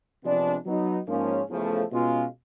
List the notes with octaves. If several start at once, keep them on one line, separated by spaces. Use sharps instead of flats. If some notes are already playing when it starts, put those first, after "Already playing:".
C3 F3 G#3 B3 D4
F#3 B3 D#4
G#2 F3 A#3 C#4
E2 C#3 F3 A3
B2 G#3 C#4 F4